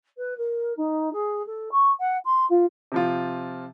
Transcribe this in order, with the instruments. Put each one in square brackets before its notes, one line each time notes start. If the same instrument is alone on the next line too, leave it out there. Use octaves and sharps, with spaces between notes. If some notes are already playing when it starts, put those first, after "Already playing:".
[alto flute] B4
A#4
D#4
G#4
A4
C#6
F#5
C6
F4
[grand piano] C3 F3 F4